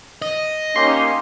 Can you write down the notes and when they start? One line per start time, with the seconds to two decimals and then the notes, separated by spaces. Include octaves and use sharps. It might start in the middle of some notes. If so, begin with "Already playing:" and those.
0.22 D#5
0.76 A#3 C#4 D#4 G4 C6